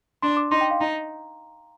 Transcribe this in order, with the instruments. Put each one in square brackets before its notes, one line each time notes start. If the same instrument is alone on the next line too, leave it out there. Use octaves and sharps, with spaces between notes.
[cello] D4 [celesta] C6
[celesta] D6
[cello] D#4 [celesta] C6
[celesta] G5
F5
[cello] D#4 [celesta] A#5